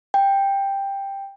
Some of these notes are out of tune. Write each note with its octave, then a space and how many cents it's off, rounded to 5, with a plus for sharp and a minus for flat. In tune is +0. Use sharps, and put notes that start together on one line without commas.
G5 +10